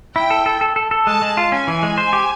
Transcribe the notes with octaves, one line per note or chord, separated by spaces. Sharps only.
E4 G5
A4
A4
A4
A4
A4
G#3 A5
G#3
F4
C#4 G#5
E3
G#3
C5
G4